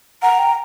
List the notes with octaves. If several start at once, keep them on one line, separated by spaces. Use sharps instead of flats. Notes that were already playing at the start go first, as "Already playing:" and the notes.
F#5 A#5
G5